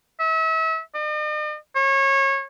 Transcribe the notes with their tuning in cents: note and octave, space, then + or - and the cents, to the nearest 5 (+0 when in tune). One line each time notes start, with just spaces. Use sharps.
E5 -35
D#5 -45
C#5 -25